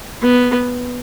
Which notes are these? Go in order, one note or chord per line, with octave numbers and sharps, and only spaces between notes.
B3